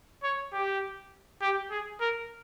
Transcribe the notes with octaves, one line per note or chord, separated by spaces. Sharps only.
C#5
G4
G4
G#4
A#4